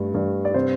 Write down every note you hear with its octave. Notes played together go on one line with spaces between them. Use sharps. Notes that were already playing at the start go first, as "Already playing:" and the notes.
Already playing: G2 A3
G2
D5
C3 C5